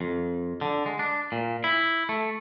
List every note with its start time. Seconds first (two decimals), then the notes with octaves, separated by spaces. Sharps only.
0.01 F2
0.61 D3
0.86 G#3
0.99 D4
1.32 A#2
1.64 E4
2.09 A3